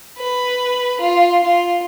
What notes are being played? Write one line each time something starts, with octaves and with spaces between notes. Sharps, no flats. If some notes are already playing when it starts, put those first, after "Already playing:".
B4
F4
F4